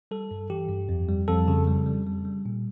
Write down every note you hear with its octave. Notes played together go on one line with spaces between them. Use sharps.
G3 A4
G2
E3 G4
G2
F2
G3
F2 A4
C#3
G3
G3
G3
G3
A#2